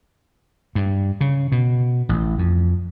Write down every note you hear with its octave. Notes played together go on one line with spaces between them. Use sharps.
G2
C#3
B2
A1
F2